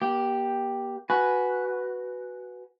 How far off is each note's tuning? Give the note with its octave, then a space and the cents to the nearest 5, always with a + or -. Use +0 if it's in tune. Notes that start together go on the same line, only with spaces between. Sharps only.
A#3 +45 G4 +0
F#4 +0 B4 +0 G#5 +15